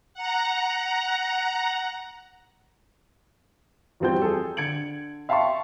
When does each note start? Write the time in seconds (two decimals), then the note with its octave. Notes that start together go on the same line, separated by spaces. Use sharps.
0.14 F#5 A#5
4.00 E2 F3 G3 C4 F#4 G6
4.22 G#4 A4
4.57 D3 G#6 C#7 D7 F#7
5.29 E5 F5 G5 A5 C6 C#6